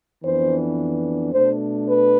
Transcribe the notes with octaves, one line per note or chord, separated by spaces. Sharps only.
F2 E3 B3 D4 C5
B2 A3 D4 C5
B4